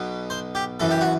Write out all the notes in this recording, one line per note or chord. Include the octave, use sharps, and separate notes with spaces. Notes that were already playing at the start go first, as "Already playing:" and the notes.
Already playing: B1 B2
C5
G4
F#2 E3 A4
G4
F#4